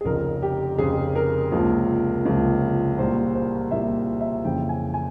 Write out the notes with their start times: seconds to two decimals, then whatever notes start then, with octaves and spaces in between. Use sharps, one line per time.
0.01 G#4
0.05 F1 F2 C#3 A#4
0.42 G4
0.78 F1 F2 C#3 G#4
1.15 A#4
1.51 C#2 C3 F3 A#3
2.25 C#2 C3 F3 A#3
2.98 C2 A#2 G3 A#3 C5
3.35 C5
3.71 C2 A#2 G3 A#3 E5
4.21 E5
4.45 F2 C#3 E3 A#3 G5
4.69 G#5
4.94 G#5